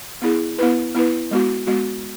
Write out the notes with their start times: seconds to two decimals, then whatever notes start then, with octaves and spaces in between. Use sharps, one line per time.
0.22 B3 E4 G#4
0.59 B3 E4 B4
0.95 B3 E4 B4
1.31 G#3 B3 F#4
1.67 G#3 B3 F#4